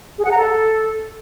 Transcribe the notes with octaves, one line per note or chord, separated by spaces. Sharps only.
G#4
F#5
A#5
A4